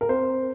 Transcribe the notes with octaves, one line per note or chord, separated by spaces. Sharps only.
A#4
C4 C5